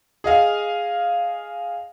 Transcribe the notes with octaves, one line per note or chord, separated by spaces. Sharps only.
G#4 D#5 F5